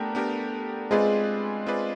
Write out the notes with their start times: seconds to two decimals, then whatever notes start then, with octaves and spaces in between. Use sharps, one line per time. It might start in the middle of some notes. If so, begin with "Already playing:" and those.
Already playing: A3 B3 D4 G4 A#4
0.15 B3 D4 G4 A#4
0.91 G#3 C4 F4 G#4 B4 D5
1.66 C4 F4 G#4 B4 D5